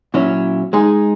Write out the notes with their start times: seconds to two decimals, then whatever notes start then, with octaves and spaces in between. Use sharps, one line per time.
0.14 A#2 F#3 C#4 E4
0.73 G#3 D#4 G#4